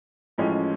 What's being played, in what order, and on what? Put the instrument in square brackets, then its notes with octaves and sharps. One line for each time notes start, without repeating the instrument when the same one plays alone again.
[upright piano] A1 A2 F3 G#3 C#4